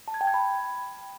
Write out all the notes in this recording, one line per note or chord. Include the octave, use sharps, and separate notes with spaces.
A5
G#6
G5
G#6
B5